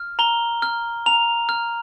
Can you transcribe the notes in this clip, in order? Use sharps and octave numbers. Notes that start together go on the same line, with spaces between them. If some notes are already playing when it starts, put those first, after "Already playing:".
Already playing: F6
A#5 G7
F6
A#5 F7
F6